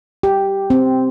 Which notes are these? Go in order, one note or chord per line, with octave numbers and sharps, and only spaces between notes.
G4
C4